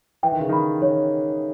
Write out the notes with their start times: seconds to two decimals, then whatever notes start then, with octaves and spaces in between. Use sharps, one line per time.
0.23 E3 G5
0.32 D#3
0.40 C#3
0.49 D#3 B5
0.82 D#3 C#5